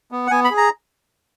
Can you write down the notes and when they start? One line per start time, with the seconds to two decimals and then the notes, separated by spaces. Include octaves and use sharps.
0.12 B3
0.27 F#5
0.31 B3 G#5
0.44 B5
0.51 G#4
0.57 A#5